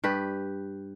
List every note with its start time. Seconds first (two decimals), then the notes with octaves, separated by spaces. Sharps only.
0.04 G2 G4 B4